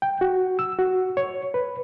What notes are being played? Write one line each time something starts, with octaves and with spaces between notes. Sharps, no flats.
G5
F#4
E6
F#4
C#5
B4